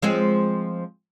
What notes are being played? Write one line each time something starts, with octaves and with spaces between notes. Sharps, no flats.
F3 G#3 C4